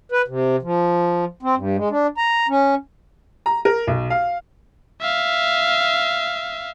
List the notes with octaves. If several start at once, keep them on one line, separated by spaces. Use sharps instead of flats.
B4
C3
F3
C4
G2
G#3
D4
A#5
C#4
A#5
A#4
B1
F5
E5 F5